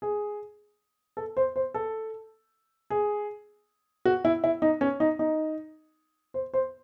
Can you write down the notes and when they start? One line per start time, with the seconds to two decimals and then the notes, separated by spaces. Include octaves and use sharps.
0.02 G#4
1.17 A4
1.37 C5
1.56 C5
1.74 A4
2.90 G#4
4.05 F#4
4.25 E4
4.44 E4
4.62 D#4
4.81 C#4
5.00 D#4
5.19 D#4
6.34 C5
6.54 C5